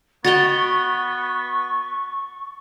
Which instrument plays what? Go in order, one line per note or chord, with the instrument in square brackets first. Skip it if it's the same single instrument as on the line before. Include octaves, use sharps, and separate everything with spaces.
[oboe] B3 [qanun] F#4 D#5 G5 [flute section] C#6 [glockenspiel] A6 F7 G7